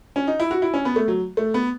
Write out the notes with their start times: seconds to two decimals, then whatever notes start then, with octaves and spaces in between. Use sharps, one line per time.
0.16 C#4
0.27 D#4
0.40 E4
0.51 F#4
0.62 E4
0.74 C#4
0.85 B3
0.96 A3
1.08 F#3
1.37 A3
1.54 B3